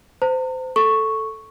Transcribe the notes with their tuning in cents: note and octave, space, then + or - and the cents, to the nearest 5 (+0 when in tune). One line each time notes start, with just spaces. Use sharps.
C5 -25 A#5 -45
A4 +0 C#6 +0